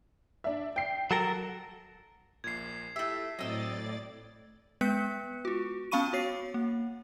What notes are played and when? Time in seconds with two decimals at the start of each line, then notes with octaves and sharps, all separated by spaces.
0.44 D4 E5
0.76 G5 C7
1.11 F#3 A4 A#4
2.44 A#1 A#2 G#6 C7
2.96 A3 E4 G4 E5
3.39 A2 F#3 C4 D5 D#5 E6 A6
4.81 G#3 B3 B4 F#6 B6 C#7
5.45 F4 F#4
5.91 B3 C#4 F5 B5 C#6 D#7
6.13 F#4 C#5 C7
6.54 A#3